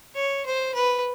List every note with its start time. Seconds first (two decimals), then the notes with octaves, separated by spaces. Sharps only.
0.15 C#5
0.46 C5
0.75 B4